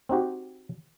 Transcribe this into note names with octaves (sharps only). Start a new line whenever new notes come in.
C4 D#4 F#4 G4